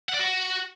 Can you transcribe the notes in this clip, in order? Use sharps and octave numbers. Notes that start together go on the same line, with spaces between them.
F#5
D5
F#4